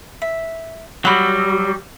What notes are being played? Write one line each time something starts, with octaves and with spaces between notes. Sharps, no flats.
E5
F#3 G3 F#4 B5